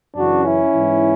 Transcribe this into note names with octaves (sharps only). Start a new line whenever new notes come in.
F#2 C#3 E3 D4 F#4
C#4 E4
G#2 E3